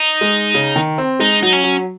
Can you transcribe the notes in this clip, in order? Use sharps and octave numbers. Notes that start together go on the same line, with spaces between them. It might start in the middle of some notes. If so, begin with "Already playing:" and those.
Already playing: D#4
G#3
C#3
D#3
C4
G#3 D#4
F#3 D#4
C#4
F#3